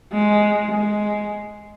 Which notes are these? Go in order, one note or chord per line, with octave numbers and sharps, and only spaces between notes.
G#3
G#3